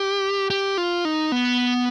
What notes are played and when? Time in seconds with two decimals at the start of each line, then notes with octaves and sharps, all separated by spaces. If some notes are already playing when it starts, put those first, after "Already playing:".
Already playing: G4
0.50 G4
0.78 F4
1.05 D#4
1.32 B3